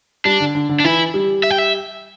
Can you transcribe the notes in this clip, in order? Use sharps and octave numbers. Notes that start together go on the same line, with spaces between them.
G3 D4
D3
D3
D3
D4
E3 E4
G3
E5
G5
E5